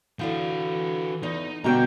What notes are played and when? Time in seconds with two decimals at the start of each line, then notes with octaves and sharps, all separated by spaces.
0.19 D3 E3 E4 F#4 F5
1.23 E2 D#4
1.64 G2 B2 D3 F#4 G5 A#5 G6